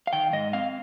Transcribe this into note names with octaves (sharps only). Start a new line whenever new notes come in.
F5
D#3 G5
G#2 D#5
C4 F5